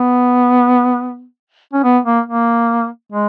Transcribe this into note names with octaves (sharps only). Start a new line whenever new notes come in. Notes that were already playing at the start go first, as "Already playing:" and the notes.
Already playing: B3
C#4
B3
A#3
A#3
G#3